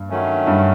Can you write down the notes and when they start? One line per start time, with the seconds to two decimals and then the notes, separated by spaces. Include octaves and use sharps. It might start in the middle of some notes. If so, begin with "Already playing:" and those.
Already playing: G2
0.10 D#3 F#3 A3 C#4
0.47 G2